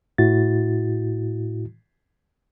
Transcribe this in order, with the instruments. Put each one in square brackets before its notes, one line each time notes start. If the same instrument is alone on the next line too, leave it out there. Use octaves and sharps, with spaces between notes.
[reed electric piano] A2 E4 F#4 A6